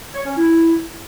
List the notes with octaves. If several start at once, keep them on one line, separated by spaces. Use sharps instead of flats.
C#5
C#4
E4